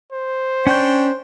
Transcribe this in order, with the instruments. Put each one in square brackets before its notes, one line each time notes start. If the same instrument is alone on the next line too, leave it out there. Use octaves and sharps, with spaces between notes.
[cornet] C5
[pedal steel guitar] C#4 G6 [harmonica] D4 C#5 G5